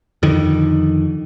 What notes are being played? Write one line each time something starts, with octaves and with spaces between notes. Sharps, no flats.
F2 D3 D#3